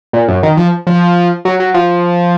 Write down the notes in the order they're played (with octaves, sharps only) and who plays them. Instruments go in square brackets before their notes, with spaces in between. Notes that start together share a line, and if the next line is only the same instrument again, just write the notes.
[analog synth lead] A#2
F#2
D#3
F3
F3
F#3
F#3
F3